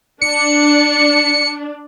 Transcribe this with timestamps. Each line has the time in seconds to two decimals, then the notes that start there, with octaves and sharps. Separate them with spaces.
0.21 D4 C#7